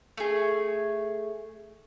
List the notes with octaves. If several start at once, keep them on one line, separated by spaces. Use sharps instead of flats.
A3 G#4